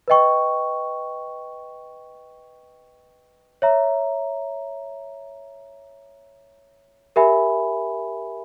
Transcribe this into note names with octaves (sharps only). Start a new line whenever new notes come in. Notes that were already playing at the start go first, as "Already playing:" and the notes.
B4 D#5 G5 C#6
C#5 E5 A#5
G4 A#4 E5 G#5 B5